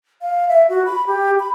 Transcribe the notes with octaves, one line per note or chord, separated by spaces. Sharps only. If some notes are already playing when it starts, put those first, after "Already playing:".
F5
E5
F#4
B5
G4
B5